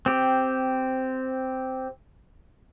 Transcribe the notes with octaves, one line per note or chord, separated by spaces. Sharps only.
C4 G4